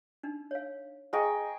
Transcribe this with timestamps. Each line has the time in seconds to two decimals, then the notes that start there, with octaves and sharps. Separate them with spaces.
0.23 D4 D#4
0.51 C#5 F5
1.13 G#4 C5 D#5 G5 G#5 A#5 C#6 A#6